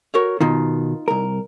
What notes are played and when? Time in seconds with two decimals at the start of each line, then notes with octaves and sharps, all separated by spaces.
0.14 F#4 A#4 C#5
0.41 B2 D#3 D#4 F4
1.08 C2 A#4